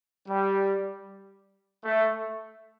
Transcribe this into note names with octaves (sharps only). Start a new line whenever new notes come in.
G3
A3